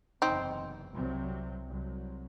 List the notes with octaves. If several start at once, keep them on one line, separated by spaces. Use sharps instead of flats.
F#1 E2 C3 C4 D#4
C2 C3 F#3 C4
C2 C3 F#3